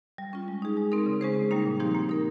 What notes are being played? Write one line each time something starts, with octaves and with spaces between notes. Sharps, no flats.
G3
C#4 F4
G#3
D#4 G#4
G#3
C4 D#4 A#4
C#3
G#3 C#4 G#4 C5
C#3
G3 A#3 D#4
A#2
F3 C4 D#4 G4
A#3
D#4 A#4